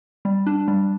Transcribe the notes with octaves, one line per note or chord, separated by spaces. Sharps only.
G3
D4
G3